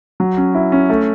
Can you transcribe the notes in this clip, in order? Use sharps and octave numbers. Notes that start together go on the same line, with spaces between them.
F#3
C#4
E4
C#4
A3